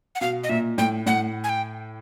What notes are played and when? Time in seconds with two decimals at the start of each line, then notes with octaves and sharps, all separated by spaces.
0.15 F#5
0.21 B2 F5
0.44 D#5
0.49 A#2 E5
0.78 A2 G5
1.06 A2 F#5
1.44 G#5
1.49 G5